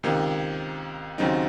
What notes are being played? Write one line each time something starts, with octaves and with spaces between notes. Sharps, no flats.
C#2 C3 D#3 A#3
D#2 C#3 F#3 C4 D#4